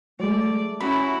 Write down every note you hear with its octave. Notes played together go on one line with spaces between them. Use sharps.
F#3 G#3 A3 D5
C#4 E4 F#4 B5